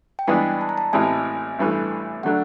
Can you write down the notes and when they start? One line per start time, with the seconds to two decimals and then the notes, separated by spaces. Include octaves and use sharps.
0.19 G5
0.28 G2 E3 G#3 B3 D4 G#5
0.61 A5
0.69 A#5
0.78 A5
0.93 A1 A2 E3 G#3 C4 G#5
1.59 A1 G2 E3 A3
2.23 D3 F#3 A3 D4 F#5